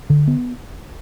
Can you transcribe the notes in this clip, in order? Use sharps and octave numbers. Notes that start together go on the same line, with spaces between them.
D3
B3